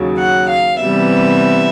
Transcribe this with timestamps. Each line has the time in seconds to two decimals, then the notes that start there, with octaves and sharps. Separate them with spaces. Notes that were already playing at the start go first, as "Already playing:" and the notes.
Already playing: D#2 C#3 F#3
0.19 F#5
0.49 F5
0.80 C3 E3 G3 B3 E5